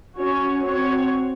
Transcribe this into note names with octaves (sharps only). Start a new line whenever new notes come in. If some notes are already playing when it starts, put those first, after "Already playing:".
C#4 F#4 C#5
C4 F#4 C#5